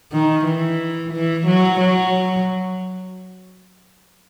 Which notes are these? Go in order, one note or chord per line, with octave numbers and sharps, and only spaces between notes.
D#3
E3
E3
F#3
F#3